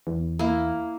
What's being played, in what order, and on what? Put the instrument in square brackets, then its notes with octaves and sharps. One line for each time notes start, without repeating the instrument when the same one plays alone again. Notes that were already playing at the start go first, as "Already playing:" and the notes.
[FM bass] E2
[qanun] A#3 E4